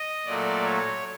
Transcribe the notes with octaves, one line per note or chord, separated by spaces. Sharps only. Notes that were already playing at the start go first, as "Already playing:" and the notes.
Already playing: D#5
A#2 F#3 A3 D5
C#5